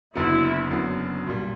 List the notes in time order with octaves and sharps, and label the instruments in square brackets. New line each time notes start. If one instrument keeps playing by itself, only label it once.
[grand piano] F#1 F#2 D3 F#3 B3 [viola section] E4
[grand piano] F#1 F#2 D3 F#3 B3
B1 A#2 G3